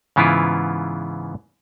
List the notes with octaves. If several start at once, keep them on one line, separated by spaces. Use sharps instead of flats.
G#2 C#3 E3 B3 E4 F4